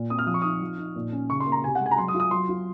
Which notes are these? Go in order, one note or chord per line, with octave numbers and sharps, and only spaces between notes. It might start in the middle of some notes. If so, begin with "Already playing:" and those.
Already playing: A#2 F4
C4 D#6
F6
F3 D#6
C#6
D#4 D#6
F3
D#4
A#2
C#4
C#3 C#6
C6
A#3
A#5
C3 G#5
F#5
G#3
G#5
A#5
F#3 C6
D#6
F4
D#6
F#3 C6
F4